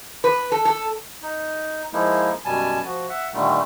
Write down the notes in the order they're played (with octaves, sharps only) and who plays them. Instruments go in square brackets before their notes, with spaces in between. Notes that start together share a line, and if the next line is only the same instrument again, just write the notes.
[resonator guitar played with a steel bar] B4
A4
A4
[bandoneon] D#4
F3 G#3 A#3 D#4 E4
F#2 B2 G3 G#5 A5
F3 F#4
E5 F#5
A#2 D3 D#3 G3 A3